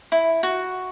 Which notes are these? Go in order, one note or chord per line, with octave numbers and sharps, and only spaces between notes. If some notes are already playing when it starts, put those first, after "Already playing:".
E4
F#4